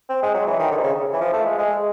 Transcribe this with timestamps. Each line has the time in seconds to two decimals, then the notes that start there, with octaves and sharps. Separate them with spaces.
0.09 C4
0.23 G#3
0.34 F#3
0.46 E3
0.59 D#3
0.71 D3
0.78 C3
0.83 C#3
1.13 E3
1.21 F3
1.33 A3
1.46 G#3
1.58 G#3